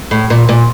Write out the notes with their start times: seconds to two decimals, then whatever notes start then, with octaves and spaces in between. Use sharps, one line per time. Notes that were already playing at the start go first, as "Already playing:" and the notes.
0.11 A2
0.30 A#2
0.49 A#2